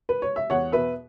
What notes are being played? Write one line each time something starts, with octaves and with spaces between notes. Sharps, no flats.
B4
C#5
E5
E2 C#5 F#5
B2 B4 E5